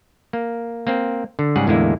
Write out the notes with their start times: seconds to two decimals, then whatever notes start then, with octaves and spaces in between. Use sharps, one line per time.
0.33 A#3
0.87 A#3 C4
1.39 D3
1.56 G#2 C#3 G3 G#4 F#5
1.67 E2 A2 D3 G#3 A#3 E4